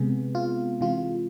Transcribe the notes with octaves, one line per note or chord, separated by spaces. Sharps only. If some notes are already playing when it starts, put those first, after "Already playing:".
Already playing: C3 G#3 B3 G#4
F4
C3 E3 G#3 F4